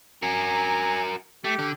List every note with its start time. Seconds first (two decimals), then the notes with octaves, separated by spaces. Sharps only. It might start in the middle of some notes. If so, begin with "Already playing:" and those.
0.22 F#4 A#4 G#5 A#5
1.44 A3 G4
1.59 D3